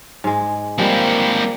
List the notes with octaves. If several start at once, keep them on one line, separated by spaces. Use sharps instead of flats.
G#2 G#3
F3 G3 G#3 A#3 C4